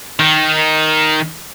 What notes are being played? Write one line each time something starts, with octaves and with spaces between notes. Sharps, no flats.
D#3